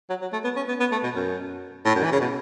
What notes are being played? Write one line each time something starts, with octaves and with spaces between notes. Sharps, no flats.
F#3
F#3
A3
B3
C#4
B3
B3
A3
B2
F#2
A2
F#2
E3
C#3
B2